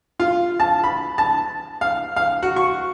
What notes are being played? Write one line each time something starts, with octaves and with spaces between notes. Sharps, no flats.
F4
A5
B5
A5
F5
F5
F#4
C#6